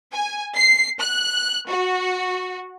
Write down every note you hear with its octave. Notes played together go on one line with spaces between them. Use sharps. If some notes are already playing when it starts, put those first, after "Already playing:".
G#5
C7
F#6
F#4